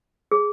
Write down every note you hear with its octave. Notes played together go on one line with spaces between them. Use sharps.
G#4